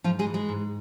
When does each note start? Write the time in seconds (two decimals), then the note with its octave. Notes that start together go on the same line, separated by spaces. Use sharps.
0.04 G#2 F3 F4
0.19 G#3 G#4
0.27 E3
0.34 G#3 G#4
0.49 G#2